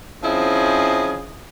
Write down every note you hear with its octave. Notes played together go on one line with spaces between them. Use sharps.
F3 C4 C#4 E4 G#4 D#5